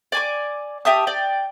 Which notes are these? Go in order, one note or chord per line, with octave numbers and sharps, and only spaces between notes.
D5 G#5 D6
G4 E5 A5 D#6
D5 G5